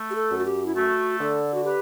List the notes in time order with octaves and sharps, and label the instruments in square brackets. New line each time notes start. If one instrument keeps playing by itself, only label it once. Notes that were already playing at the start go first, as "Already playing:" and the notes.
Already playing: [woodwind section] A3
[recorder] G4
A4
[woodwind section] F#2
[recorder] F#4
G4
E4
[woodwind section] A3 [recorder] F#4
[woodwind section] D3 [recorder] A4
[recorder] F#4
[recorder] G4 [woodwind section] B4